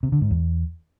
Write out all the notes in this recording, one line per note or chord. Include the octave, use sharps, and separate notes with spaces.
C3
D3
G#2
E2